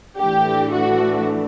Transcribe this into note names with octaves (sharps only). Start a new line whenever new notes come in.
A2 E3 A3 D4 G4
F#4